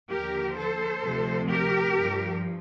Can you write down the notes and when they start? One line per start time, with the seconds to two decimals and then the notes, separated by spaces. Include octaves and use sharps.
0.12 D#2 D3 F3 G4 A#4
0.58 A4 C5
1.03 D2 C3 F3
1.50 G4 A#4
1.96 G2 F3